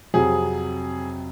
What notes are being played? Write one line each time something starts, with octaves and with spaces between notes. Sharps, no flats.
F2 C3 F#3 G#4